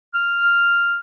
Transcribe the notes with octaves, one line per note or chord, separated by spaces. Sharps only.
F6